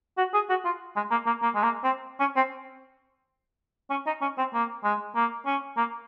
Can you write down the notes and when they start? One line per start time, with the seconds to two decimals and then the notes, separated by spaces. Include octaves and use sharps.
0.18 F#4
0.34 G#4
0.49 F#4
0.65 F4
0.96 G#3
1.11 A#3
1.26 A#3
1.42 A#3
1.55 G#3
1.63 A#3
1.84 C4
2.20 C#4
2.36 C4
3.90 C#4
4.07 D#4
4.22 C#4
4.38 C4
4.54 A#3
4.84 G#3
5.16 A#3
5.46 C#4
5.77 A#3